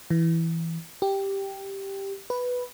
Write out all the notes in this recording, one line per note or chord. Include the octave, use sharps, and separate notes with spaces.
E3
G4
B4